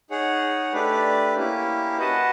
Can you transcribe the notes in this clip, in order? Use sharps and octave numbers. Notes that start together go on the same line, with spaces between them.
D#4 G#4 C#5 F#5
A3 D4 G4 B4 D5
A#3 C#4 E4 G4
F#4 B4 D#5 F#5 A5